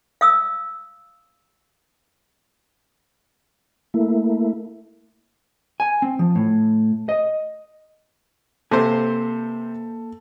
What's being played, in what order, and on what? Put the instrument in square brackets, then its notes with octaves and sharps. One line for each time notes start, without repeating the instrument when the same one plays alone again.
[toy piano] F5 D#6 E6
[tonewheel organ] A3 A#3 E4
[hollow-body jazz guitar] G#5
C4
F3
A2
D#5
[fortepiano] C3 C5 [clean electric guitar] A#3 B4 G#5 [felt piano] A4